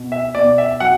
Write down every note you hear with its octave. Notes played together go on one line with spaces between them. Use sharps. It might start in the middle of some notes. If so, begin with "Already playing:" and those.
Already playing: B2
E5
B2 D5
E5
F#3 F#5